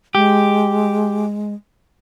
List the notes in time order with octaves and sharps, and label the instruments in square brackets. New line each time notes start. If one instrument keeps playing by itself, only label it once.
[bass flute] G#3 [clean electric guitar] G4